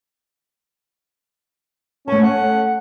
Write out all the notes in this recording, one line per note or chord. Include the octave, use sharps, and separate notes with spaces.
A3 C#4 A5
F#5